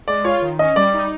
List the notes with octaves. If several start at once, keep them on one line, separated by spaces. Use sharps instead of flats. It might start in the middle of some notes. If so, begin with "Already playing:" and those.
G#3 D5
F4 C#5
D#3
C#4 D#5
G3 D5
D#4